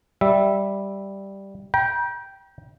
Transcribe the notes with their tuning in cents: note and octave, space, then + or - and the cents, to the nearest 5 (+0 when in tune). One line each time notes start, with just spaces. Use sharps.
G3 +0 E5 +0
G5 -5 A#5 +45